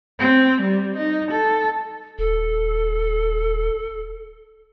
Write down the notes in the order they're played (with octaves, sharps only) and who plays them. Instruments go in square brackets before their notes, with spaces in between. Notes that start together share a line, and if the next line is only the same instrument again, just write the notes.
[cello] C4
G3
D#4
A4
[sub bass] D#1 [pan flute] A4